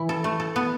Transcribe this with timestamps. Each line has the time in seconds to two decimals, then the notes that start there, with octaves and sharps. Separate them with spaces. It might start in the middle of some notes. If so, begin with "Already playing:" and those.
Already playing: E3 E4
0.09 A4
0.24 A3
0.40 A4
0.56 B3